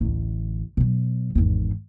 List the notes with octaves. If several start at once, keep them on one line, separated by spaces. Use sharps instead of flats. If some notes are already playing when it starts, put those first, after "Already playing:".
A1 D2
B2 F#3
G#1 E2